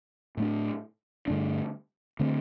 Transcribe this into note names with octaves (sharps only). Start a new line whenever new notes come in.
A2 A3 D4
G2 D3 A3 D4
D3 A3 C4